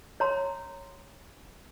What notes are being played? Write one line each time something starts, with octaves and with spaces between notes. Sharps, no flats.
C#5 A#5 C6